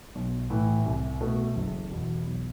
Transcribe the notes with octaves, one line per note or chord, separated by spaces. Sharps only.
B1
A2 E3
C2
B2 A3
F#1
E2 B2
B1